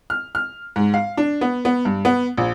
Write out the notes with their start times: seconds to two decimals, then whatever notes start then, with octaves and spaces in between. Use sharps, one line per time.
0.10 F6
0.35 F6
0.76 G#2
0.94 F5
1.17 D4
1.41 B3
1.65 B3
1.85 G2
2.05 B3
2.37 A#1